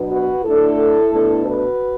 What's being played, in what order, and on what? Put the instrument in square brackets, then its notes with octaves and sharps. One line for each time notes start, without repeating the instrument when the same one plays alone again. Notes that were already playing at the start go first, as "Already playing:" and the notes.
Already playing: [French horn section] B2 F#3 B3 D4
F#4 B4
A2 A3 D4 E4 A4
B2 A3 D4
F#4 B4